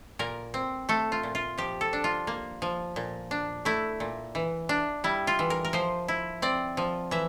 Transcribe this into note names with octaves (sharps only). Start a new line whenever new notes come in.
A#2 A#4
C4
A3 A4
F4
A#2
F4
F3 G4
A4
D4
F4
A#3
F3
A#2
D4
A3 E4
A#2
E3
D4
G3 E4
F4
E3
A#4
A#4
F3 C5
E4
C4 D5
F3
E3 E5